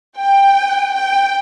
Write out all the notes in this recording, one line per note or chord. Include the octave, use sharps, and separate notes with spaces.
G5
G5